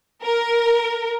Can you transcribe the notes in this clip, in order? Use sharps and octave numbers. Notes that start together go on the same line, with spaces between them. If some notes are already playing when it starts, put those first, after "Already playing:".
A#4